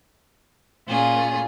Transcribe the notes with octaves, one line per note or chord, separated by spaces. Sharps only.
A#2 C#4 F4 G#4